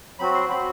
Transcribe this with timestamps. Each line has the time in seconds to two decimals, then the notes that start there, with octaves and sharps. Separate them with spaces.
0.19 F#3 C4 F#4 B5
0.35 C6
0.50 F#3 C4 F#4 B5